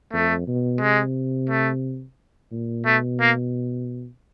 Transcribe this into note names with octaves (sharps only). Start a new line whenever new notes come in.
F2 A3
B2
C3 G#3
A3
A#2
B2 A3
A#3